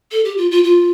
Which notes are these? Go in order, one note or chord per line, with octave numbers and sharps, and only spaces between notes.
A4
G4
F4
F4
F4